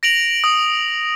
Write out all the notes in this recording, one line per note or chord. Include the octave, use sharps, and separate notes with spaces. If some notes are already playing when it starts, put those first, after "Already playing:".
A#6 D7 F7 F#7
D#6